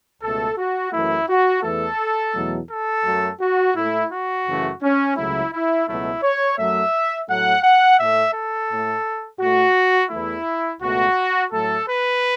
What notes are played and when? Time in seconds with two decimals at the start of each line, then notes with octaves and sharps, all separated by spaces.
0.22 C#2 B2 A3 A4
0.58 F#4
0.92 F#2 E3 A3 E4
1.28 F#4
1.63 E2 E3 A3 A4
2.34 E2 B2 F#3 A3
2.69 A4
3.04 F#2 F#3 A3
3.40 F#4
3.75 A2 A3 E4
4.10 F#4
4.46 F#2 C#3 E3 A3
4.82 C#4
5.16 C#2 C#3 F#3 A3 E4
5.52 E4
5.87 C#2 B2 F#3 A3 E4
6.22 C#5
6.58 F#2 F#3 A3 E5
7.28 A2 F#3 A3 F#5
7.63 F#5
7.98 A2 A3 E5
8.34 A4
8.70 A2 A3
9.40 A2 A3 F#4
10.11 E2 E3 A3 E4
10.81 C#2 B2 A3 F#4
11.51 A2 F#3 A3 A4
11.87 B4